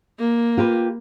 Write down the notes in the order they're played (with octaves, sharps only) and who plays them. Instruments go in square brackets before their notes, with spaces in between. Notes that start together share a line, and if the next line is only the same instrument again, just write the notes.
[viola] A#3
[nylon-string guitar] F4 G4 B4